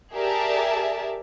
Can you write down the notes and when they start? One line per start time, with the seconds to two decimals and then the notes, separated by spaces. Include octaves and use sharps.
0.13 G4 G#4 A#4 D5 E5 A5